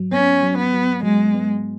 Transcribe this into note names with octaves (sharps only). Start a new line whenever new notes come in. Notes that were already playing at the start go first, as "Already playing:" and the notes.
Already playing: G#2 F#3
B3 C#4
F#3
B3
F#3
F#3 G#3
B3